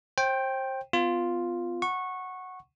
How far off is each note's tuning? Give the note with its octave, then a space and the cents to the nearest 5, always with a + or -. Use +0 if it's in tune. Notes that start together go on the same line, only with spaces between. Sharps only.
C5 +30 G5 +0
B3 +35 F4 +0
F#5 +0 C#6 -15